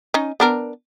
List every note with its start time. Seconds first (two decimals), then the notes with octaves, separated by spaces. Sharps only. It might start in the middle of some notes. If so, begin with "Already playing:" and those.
0.14 C#4 D#4
0.40 B3 D4 A#4